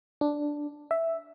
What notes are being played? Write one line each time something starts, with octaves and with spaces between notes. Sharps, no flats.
D4
E5